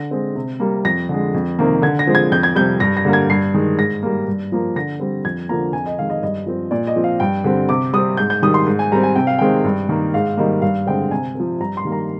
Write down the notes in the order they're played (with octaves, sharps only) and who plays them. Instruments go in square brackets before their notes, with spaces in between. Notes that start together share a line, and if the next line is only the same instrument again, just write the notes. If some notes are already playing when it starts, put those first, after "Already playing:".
Already playing: [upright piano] D3 A#6
G#3 C4
C3
G3 A#3
F2 A#6
D3 G#3
F2
C3 D#3 A#3
D3 G#6
A#6
F3 G#3 C4
G#6
F2 G6
G#6
C3 G3 G6
G2 A#6
A#6
D3 G3 A#3
G#6
G2 C7
D#3 G#3
G#2 A#6
G3 A#3
G2
F3 A#3
D3 A#6
G3 C4
F2 G#6
D3 F3 A#3 A#5
F2 G#5
D#5
D#3 G#3 F5
D#5
G2 D#5
F3 C4
A#2 D5
D#5
F3 C4
F5
G2 G5
D3 G3 C4
C3 D6
G3 C4 D#6
G#2 G6
G6
D#3 G3 D#6
C6
G#2
G#5
G3 C4 A#5
G#5
C3 G5
F5
D#3 G#3 C4 G5
G2
D#3 A#3
G#2 F5
D#3 G3 A#3 D#5
G2 F5
D3 G#3 C4 G5
C3 G#5
F3 C4
G2 A#5
C6
D#3 G3 A#3
A#5